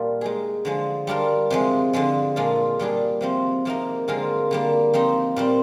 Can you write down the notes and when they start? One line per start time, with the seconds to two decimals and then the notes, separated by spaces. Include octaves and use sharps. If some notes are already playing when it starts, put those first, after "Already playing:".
Already playing: A#2 G3 A#3 D4 F4
0.21 G#3 D#4 G#4
0.65 D3 F3 G#3
1.07 G3 D4 F4 A#4
1.50 C3 F3 G#3
1.93 D3 F3 G#3
2.36 A#2 G#3 D4 F4
2.79 A#2 G3 D4 G#4
3.21 C3 F3 C4
3.65 C3 F3 A#3 D#4 A#4
4.08 D3 G#3 C4 F4 A#4
4.51 D3 G3 A#3
4.93 F3 C4 D#4
5.36 A#2 G3 C4